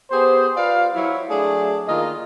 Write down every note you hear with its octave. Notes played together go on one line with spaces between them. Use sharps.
B3 G4 G#4 C5
F4 B4 D5 F5
F#3 E4
F#3 A3 D4 G#4
D#3 A#3 F4 D#5